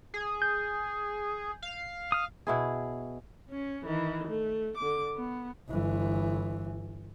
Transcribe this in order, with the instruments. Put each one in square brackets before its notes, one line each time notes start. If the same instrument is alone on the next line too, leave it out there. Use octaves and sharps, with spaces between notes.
[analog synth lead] G#4
[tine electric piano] G6
[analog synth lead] F5
[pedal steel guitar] D#6 F6
[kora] B2 E4 G#4
[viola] C#4
D#3 E3
A3
D3 D6
B3
[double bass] G1 E3